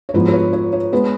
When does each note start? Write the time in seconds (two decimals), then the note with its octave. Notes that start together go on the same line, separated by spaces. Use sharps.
0.09 C#5
0.14 G#2 F3 B3 B4
0.29 B4
0.33 C#5
0.53 C#5
0.73 C#5
0.92 G#3 B3 B4